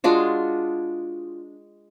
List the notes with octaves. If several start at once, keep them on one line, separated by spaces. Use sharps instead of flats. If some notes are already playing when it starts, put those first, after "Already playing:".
G#3 D4 F4 F#4